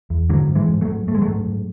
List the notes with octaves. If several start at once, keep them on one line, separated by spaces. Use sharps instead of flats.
E2
G#2 D3 F#3
G#2
E3 G#3
G#2
F#3 A3
G#2
G#2 A3
G#3
F#3 A3
G#2
G#2